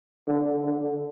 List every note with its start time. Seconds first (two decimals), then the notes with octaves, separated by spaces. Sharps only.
0.28 D3
0.65 D3